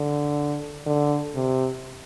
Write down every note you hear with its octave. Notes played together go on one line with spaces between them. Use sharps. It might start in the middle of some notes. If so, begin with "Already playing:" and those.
Already playing: D3
D3
C3